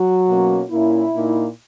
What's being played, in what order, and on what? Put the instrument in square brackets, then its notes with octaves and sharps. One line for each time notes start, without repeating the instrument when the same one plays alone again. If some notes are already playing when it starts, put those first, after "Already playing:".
Already playing: [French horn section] F#3 F#4
B2 A#3 C#4
A#2 A#3 C#4 E4
A#2 A#3 D#4